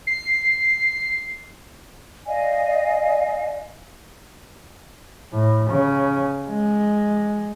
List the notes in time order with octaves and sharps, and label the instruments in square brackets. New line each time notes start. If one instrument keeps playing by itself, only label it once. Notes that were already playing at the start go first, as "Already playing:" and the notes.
[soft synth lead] C7
[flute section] D5 D#5 F5 G#5
[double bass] A2
C#3
G#3